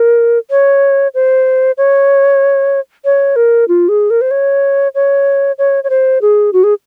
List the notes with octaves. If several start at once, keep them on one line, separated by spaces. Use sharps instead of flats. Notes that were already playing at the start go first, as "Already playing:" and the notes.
Already playing: A#4
C#5
C5
C#5
C#5
A#4
F4
G#4
A#4
C5
C#5
C#5
C#5
C#5
C5
G#4
F#4
G#4